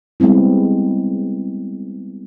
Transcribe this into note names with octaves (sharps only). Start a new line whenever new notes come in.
G3 G#3 B3 C4 E4